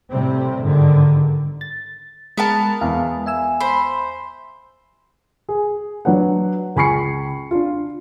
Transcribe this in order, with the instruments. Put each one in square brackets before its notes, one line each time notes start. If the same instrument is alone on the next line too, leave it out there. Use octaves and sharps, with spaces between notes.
[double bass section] A2 C3 G3 C4
G1 G#2 D3 D#3
[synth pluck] A6
[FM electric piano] G#3 [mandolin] B3 A#4 A5
[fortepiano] E2 [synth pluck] F5
[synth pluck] E5 G#5 E6
[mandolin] C5 [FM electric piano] B5
[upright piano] G#4
F#3 D4 B4 F#5
C#2 G#5 B5 C#6 C7 C#7
D4 F4